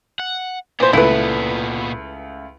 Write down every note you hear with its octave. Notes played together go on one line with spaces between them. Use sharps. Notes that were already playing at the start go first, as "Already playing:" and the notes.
F#5
A#2 E3 B3 C5
C#2 A3 E4 B4